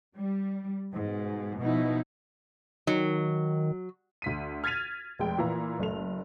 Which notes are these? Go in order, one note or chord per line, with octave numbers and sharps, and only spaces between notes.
G3
G#2 B2
B2 F3 D#4 E4
D#3 F#3
D2 B6 D#7
F6 G#6 A6 B6 D#7 F7
F1 G#3 G5
A#2 E3 E4 F4 A#5
F#1 A3 F7